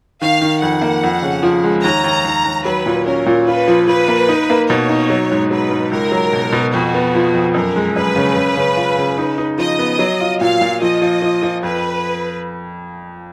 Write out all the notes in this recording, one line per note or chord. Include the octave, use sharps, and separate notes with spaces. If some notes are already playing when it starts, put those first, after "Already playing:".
D#3 F5
D#3
F2 F#5
A#3
F2
C#3
F3
G#3
D#2 A#5
D#2
D#2
D#2
F#3 B4
A#2
C#4 A#4
A#2
F4 B4
F3
F3 B4
A#3
D#4
A#3
B2 C#5
D#4
F#3
G#2
F#3 B4
G#2
C#2 A#4
F#3
B2
B2
F2 F#4
B3
F3
F2
F#2 A#4
G#3
F#2 B4
C#3
C#3
C#3
F4
C#3
D#4
D#4
F3 D#5
B3
F#3
F4
A#2 F5
A#2
F3 D#5
F3
F3
F3
F2 B4